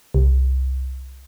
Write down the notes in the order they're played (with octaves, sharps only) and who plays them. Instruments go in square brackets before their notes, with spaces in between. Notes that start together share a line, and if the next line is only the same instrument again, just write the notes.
[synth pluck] C2